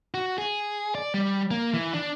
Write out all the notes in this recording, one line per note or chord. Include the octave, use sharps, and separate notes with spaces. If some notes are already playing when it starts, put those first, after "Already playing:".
F#4
G#4
D5
G3
A#3
E3
D4